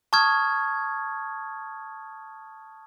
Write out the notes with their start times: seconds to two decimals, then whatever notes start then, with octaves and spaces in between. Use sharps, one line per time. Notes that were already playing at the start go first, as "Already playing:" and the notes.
0.13 A5 C#6 D#6 F6 G#6